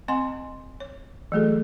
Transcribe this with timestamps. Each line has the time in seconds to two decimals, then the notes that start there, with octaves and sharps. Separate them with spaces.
0.08 C4 D#5 F#5 G#5 C6
0.80 C#5
1.32 E3 F#3 A3 F#4 G#4 A4